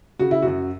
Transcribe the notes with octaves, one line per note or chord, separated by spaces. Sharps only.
C#3 F#4
E4
F#2 F#4